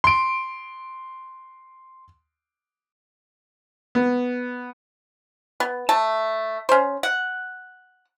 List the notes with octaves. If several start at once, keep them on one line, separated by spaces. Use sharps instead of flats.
C6 D7
B3
B3
A3 A5
C#4 C5
F#5